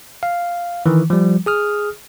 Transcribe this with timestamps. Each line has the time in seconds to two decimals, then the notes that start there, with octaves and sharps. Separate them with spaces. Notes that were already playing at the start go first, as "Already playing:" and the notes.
0.23 F5
0.86 D#3 E3
1.10 F3 G3
1.46 G#4 D#6 F6